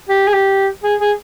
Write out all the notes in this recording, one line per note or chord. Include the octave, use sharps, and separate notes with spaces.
G4
G#4
G4
G#4
G#4